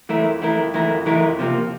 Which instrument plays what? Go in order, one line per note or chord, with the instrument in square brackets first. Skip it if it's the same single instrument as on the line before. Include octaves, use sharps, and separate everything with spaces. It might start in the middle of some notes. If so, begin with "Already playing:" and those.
[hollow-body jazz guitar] E3 A3 E4 A#4
F2
E3 A3 E4 A#4
F2
E3 A3 E4 A#4
F2
E3 A3 E4 A#4
F2
C3 F3 A#3